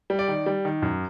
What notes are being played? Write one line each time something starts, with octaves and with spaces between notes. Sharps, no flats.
G3
D5
D#3
G3
D#3
F#2